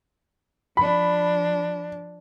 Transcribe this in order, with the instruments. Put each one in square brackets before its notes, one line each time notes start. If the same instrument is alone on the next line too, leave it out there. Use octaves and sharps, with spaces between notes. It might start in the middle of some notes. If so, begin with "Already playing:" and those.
[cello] F3 D4 [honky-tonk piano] B5